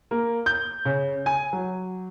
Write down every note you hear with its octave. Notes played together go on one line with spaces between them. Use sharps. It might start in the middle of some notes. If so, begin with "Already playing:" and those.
A#3
G6
C#3
G#5
F#3